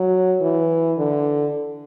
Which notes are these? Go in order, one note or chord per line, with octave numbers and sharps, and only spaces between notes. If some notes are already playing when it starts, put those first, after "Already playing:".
Already playing: F#3
E3
D3